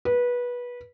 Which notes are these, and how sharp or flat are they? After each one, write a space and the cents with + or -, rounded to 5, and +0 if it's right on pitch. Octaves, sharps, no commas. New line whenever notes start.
B4 -20